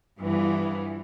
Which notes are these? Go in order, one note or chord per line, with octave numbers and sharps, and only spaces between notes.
G2 E3 F3 B3